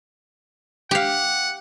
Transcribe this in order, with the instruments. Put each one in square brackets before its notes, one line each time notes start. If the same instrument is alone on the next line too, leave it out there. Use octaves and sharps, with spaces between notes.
[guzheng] G4 F5 [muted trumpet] F#5